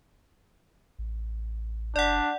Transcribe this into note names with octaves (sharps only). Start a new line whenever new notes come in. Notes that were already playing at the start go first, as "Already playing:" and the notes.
A1
F#1 D4 D5 F#5